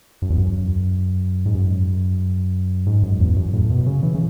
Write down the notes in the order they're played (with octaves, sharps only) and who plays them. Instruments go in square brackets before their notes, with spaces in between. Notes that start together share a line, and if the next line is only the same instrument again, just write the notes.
[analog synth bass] F#2
E2
F#2
G#2
F#2
G#2
F#2
E2
F#2
A2
B2
C#3
E3
C#3